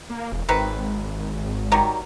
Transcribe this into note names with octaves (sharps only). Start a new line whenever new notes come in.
A#3
E1
G#1 D#3 C4 B4
D#3 F#3 G3